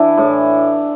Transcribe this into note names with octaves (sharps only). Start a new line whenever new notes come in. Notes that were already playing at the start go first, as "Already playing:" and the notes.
Already playing: E3 D4 E4
A2